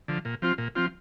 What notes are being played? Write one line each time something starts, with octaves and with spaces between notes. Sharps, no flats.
D3 F3
A#2
F3 C4 F4
A#2
F3 C4 F4